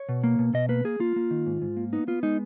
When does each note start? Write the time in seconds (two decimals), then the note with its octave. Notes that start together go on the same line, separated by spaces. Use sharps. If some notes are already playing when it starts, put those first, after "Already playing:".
Already playing: C#5
0.09 B2
0.24 A#3
0.39 B2
0.54 B2 D#5
0.69 A#3 B4
0.84 A#3 G#4
1.00 A#3 F4
1.16 A#3
1.31 D#3
1.46 G#2
1.62 G#2
1.77 A#3
1.93 B3 D#4
2.07 B3 F4
2.23 G#3 D#4